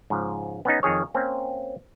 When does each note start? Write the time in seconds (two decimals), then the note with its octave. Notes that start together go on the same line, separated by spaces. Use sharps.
0.10 G#2 C#3 F3
0.65 B3 C#4 D#4
0.83 F2 D#3 G#4 C#5
1.14 A#3 C4 C#4